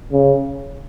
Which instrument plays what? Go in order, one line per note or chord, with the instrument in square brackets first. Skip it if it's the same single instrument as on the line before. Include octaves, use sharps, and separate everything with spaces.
[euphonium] C#3